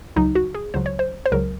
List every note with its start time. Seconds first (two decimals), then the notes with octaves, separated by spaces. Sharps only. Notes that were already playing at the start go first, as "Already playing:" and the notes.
0.16 C#2 C#3 F#3 D#4
0.35 F#4
0.55 G#4
0.74 C#2 C#3 F#3 C5
0.86 C#5
0.99 C5
1.26 C5
1.32 C#2 C#3 F#3 A#4